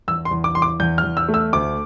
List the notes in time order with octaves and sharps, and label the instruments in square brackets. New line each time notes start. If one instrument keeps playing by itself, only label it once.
[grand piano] E2 E6
C6
E2
D6
E2 C6
D6
E2 G6
F6
E2
E6
A3
E6
D2 D6